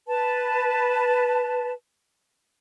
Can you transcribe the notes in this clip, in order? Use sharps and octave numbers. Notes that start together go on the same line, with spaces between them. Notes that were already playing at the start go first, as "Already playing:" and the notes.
B4 A5